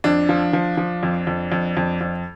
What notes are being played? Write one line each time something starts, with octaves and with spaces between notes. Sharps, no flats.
F2 D4
F3
F3
F3
F2
F2
F2
F2
F2